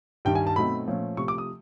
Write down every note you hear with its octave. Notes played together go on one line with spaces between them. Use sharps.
G2 D#3 G3 G5
G#5
A5
B2 F#3 A3 C4 D#4 B5
A#2 F3 A3 C#4
C3 F3 A3 C#6
D6
D#6